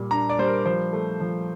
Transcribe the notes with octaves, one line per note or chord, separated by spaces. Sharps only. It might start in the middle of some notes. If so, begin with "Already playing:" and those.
Already playing: A#2 G3
D4 A#5
D5
G3 C5
A#4
F3 C5
A3
F3